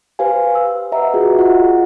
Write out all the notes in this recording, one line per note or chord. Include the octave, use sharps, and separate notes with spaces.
G4 B4 C5 F5 G#5
E6
B4 D#5 E5 F#5 A#5
F4 F#4 G#4
F4 D#5 F#5